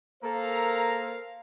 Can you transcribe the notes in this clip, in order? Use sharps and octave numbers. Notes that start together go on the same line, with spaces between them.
A#3 A4 A#4 C5 F5 A#5